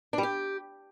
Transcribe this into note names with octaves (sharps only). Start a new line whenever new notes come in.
D4
G3
G4